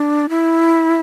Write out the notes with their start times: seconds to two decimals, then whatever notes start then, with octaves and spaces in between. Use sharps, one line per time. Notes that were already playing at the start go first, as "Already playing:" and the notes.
Already playing: D4
0.29 E4